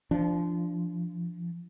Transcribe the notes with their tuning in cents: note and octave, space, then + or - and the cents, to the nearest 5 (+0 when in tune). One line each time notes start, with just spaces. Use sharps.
F3 -20 D4 +0